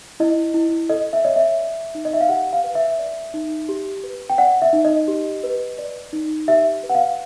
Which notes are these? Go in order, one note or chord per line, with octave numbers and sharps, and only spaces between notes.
E4 D#5
E4
A4 D#5
E5
C#5 D#5
E5
D5
D#4
D#5
E5
F5
G4 F#5
F5
B4
E5
D5
D#4
G4
B4
G5
D5 F#5
E5
D#4
D#5
G4
B4
D5
D#4
G4 E5
B4
F#5
F5